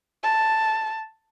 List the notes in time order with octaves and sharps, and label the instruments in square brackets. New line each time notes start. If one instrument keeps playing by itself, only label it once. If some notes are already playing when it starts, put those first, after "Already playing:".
[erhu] A5